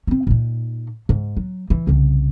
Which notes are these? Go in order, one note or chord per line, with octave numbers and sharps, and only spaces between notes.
C4 C#4
A#2 D#4
G#2
F#3
E3
C2 C#3